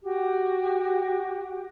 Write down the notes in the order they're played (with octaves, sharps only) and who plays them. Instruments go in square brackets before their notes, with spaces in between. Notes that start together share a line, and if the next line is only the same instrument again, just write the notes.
[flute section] F#4 G4